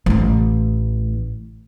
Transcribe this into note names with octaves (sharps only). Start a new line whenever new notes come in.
A1 A3